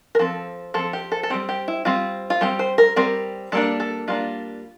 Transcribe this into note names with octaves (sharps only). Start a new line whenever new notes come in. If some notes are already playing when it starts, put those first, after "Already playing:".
A#4
F3 C4 A4
F3 C4 A4
G4
A4
A4
G3 C4 G4
G4
E4
G3 C4 F4
F4
G3 C4 G4
C5
A#4
G3 C4 A#4
G3 A#3 D4 A4
A4
G3 A#3 D4 F4